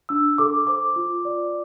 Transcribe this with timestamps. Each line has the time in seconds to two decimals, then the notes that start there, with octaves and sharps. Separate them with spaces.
0.09 D4 E6
0.38 A4 D6
0.67 C5 D6
0.96 F4
1.25 D5